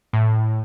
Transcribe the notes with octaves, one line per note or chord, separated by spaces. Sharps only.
A2